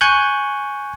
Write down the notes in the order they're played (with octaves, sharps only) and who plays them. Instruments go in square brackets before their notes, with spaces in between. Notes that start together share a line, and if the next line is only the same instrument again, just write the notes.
[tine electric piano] G#5 C#6 F#6 G6